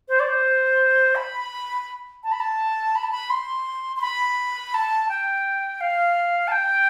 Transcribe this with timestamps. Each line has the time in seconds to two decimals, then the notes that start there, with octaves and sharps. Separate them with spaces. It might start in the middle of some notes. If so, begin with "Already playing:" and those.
0.09 C5
0.20 D5
0.29 C5
1.16 B5
2.24 A5
2.32 B5
2.40 A5
2.95 B5
3.03 A5
3.11 B5
3.30 C6
3.96 C6
4.02 B5
4.74 A5
5.09 G5
5.81 F5
6.48 A5
6.52 G5